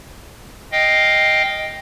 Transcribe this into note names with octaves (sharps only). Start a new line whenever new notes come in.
D#5 F5 G5